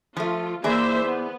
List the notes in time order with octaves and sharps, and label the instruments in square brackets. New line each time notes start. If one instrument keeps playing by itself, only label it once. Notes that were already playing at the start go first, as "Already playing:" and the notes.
[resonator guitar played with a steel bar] F3 A3 [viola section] F4
[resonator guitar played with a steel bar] E3 G#4 D5 [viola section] A#3 C5 E5
[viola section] B3